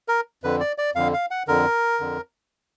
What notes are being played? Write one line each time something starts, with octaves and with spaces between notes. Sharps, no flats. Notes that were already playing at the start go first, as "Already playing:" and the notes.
A#4
F2 D3 B4
D5
D5
F2 D3 F5
F5
F#5
F2 D3 A#4
F2 D3